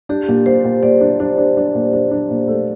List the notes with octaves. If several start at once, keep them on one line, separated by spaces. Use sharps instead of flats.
D4 G4
A#2
A#2 C5
A#2
A#2 D5
D4
D4
D4
D4
A#2
D4
D4
A#2
A3